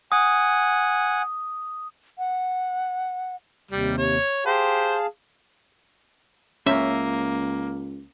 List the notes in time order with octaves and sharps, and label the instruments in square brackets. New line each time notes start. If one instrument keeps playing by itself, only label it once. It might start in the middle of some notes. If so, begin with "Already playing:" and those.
[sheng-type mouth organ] F#5 G#5 [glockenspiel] D#6
[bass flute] F#5
[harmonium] D#2 C3 [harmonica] G3
[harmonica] C#5
[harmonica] G4 C5 [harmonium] G#4 F5 A5
[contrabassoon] C#2 [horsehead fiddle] A#3 [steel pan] C#4 [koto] E5